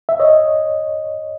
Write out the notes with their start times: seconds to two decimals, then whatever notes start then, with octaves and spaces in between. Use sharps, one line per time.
0.09 E5
0.20 C#5 D#5